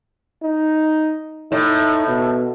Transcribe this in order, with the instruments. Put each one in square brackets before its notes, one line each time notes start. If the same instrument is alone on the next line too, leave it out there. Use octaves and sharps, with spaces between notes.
[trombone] D#4
[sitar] A2 [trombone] D#4
[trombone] B2